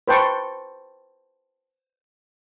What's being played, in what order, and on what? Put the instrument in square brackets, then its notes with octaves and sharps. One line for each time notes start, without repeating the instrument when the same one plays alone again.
[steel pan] B4 C5 G5 A5 C#6